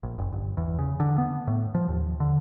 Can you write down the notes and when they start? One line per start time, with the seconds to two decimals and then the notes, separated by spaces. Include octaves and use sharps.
0.03 A#1
0.18 F#1
0.33 G1
0.57 E2
0.79 C#3
1.00 D3
1.18 B3
1.47 A2
1.75 F3
1.89 D#2
2.20 D3